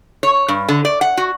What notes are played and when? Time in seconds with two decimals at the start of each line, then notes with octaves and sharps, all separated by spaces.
0.23 C#5
0.48 G2
0.69 D3
0.85 D5
1.01 F#5
1.17 F#4